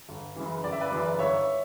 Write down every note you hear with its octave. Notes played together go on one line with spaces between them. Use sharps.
G1
F#2 C#3 E3
G1 D5
E5
B4 D5
F#2 C#3 E3
G1 C#5 E5